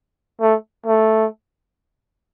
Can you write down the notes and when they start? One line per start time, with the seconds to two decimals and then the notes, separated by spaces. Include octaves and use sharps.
0.41 A3
0.86 A3